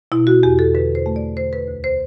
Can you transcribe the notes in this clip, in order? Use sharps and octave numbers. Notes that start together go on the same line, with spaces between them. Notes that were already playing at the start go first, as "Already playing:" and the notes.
B2 E4
F#4
E2 G4
A4
D3 B4
C5
A3
D5
D3 C5
B4
D2
C5